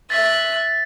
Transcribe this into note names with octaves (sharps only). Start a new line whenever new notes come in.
E5 F#6 A6 B6